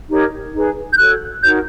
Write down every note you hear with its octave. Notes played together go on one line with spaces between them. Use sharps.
D#4 G4 A#4 C#5
D#4 G#4 B4
G6
F#4 A4 C#5 F#6
D#4 F#4 A#4 C#5 G6